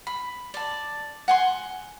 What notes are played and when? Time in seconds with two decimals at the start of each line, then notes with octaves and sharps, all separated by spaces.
0.07 B5
0.54 D5 A5
1.28 F#5 G#5 C6